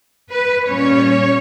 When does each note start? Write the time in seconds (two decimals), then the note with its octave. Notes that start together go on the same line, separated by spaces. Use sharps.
0.31 B4
0.67 A#2 G3 C#4 C#5